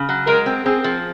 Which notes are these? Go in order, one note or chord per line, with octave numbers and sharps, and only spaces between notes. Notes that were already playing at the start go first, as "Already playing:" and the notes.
Already playing: C#3
F#3
G#3 A#4
C4
C4 G#4
F3